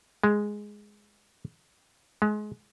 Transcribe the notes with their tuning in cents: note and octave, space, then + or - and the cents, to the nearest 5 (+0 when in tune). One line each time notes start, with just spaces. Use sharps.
G#3 +0
G#3 +25